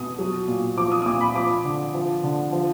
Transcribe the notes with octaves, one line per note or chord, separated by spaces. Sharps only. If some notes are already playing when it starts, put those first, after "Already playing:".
Already playing: B2 D#6
F#3
A#2
F3 D6
D#6
D#6
A#2 D6
B5
F3 D6
D3
F3
D3
F3